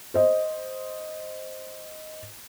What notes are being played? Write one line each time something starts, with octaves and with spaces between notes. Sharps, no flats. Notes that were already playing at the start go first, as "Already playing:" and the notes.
C5 D#5